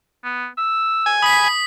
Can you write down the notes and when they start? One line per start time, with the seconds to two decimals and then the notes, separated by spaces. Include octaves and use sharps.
0.24 B3
0.58 E6
1.06 G#5
1.22 B5 D#6 B6